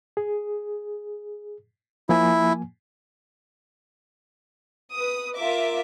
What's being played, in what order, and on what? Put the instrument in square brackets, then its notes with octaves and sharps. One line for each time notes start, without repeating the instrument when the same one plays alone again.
[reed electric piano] G#4
[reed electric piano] F3 A#3 G#5 [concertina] E4
[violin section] B4 D#6
F4 A#4 E5 D6